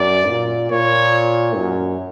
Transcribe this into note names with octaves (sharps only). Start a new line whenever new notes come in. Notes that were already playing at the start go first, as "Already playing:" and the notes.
Already playing: F#2 D5
A#2
A#2 C#5
F#2